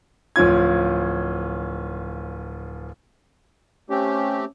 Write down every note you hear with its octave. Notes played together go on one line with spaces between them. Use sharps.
D1 F3 C#4 F4 G#6
A3 C4 C#4 G4